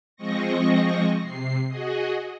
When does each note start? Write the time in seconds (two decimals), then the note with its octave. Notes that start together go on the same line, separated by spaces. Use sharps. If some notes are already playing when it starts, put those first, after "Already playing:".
0.16 F3 G#3 C4 D#5 C#6 A#6
1.21 C3 C7
1.68 F#4 G#4 D#5